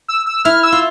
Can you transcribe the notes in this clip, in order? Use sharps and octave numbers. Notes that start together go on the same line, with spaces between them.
E6
E6
E4 F6
E6
F4